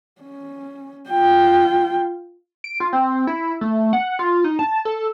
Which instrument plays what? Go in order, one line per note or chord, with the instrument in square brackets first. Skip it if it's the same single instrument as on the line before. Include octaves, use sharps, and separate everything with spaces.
[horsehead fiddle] C#4
F4 G5
[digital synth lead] D7
F4
C4
E4
A3
F#5
F4
D#4
A5
A4